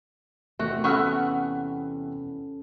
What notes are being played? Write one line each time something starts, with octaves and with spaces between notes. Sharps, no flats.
E2 C3 A3 F#4
B3 C#4 A4 F#5 C#6 E6 F6